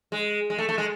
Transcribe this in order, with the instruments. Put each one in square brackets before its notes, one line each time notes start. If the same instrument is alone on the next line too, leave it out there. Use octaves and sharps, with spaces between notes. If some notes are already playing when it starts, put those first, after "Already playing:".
[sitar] G#3
G#3
A3
A3
G#3